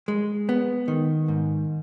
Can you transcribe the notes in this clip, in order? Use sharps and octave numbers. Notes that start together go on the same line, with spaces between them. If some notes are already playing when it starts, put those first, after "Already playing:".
G#3
B3
D#3
G#2